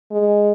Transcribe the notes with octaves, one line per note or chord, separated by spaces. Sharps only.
G#3